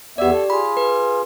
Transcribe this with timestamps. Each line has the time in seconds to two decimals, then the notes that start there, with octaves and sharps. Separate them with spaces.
0.18 E2 B3 G4 D5 E5
0.31 A4
0.50 F4 G#4 B5
0.77 B4